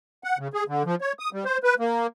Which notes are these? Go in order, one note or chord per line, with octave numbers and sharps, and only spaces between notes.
F#5
C#3
G#4
D3
F3
C#5
D#6
G3
C5
B4
A#3